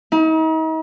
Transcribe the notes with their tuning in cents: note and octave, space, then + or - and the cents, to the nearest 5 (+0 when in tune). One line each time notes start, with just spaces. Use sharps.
D#4 +40